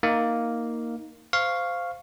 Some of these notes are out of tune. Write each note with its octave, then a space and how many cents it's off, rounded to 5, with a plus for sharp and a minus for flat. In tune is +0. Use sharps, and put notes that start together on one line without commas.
A#3 +0 D#4 +10 F5 +0
C5 -20 F5 +0 C#6 +0